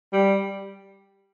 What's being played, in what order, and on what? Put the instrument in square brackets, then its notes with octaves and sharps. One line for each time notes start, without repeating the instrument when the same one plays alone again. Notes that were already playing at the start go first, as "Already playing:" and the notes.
[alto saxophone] G3